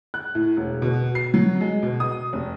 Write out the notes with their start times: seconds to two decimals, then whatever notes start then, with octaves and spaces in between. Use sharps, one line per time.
0.14 F#6
0.35 A2
0.57 E1
0.82 B2
1.15 C7
1.34 F#3
1.61 G#3
1.83 B2
2.00 D#6
2.33 F1